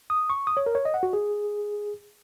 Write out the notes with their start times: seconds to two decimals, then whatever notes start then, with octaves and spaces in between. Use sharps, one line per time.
0.10 D#6
0.30 C#6
0.47 D#6
0.57 C#5
0.66 A#4
0.75 C#5
0.85 D#5
0.94 F#5
1.03 F#4
1.13 G#4